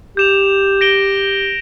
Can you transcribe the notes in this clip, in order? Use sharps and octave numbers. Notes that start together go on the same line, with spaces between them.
G4 G6 E7 F7
A#6 D7 G7